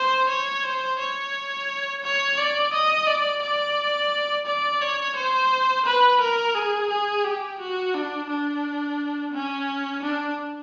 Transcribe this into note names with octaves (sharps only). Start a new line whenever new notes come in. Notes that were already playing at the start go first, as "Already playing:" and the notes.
Already playing: C5
C#5
C5
C#5
C#5
D5
D#5
D5
D5
D5
C#5
C5
B4
A#4
G#4
G#4
G4
F#4
D4
D4
C#4
D4